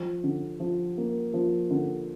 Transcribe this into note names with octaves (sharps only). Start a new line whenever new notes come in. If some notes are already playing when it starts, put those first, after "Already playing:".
Already playing: F3
D3
F3
A#3
F3
D3